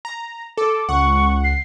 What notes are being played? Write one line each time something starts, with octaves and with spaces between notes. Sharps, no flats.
A#5
A4 D6
C#2 F#5 C#6
C7